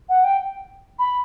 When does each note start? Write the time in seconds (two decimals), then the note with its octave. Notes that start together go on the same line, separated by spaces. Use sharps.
0.09 F#5
0.24 G5
0.99 B5